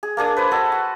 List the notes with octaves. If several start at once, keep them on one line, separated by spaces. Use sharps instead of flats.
G#4
A#3 D4 G#4 D#6
B4 C5 D#6
F#4 A4 D#5
F#4